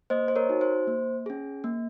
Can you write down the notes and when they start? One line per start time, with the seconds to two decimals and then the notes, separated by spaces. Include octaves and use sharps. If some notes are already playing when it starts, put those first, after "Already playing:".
0.10 A#3 C5 D#5
0.28 C5
0.36 A#4 C#5
0.49 D#4 F#4
0.61 C5
0.87 A#3
1.26 C#4 G#4
1.64 A#3